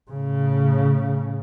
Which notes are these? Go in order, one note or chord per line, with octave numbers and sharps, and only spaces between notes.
A2 C#3